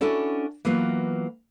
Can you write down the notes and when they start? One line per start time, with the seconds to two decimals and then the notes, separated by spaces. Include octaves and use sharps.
0.01 C#4 D4 E4 F#4 A4 D5
0.65 E3 F#3 A#3 B3 F4 F#4